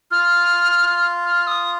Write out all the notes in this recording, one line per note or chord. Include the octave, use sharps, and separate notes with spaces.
F4 F6
F6
D#6